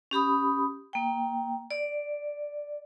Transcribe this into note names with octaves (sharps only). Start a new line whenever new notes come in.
C#4 G4 B5 D#6
A#3 G5
D5